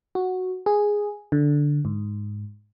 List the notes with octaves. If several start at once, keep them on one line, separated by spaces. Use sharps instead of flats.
F#4
G#4
D3
G#2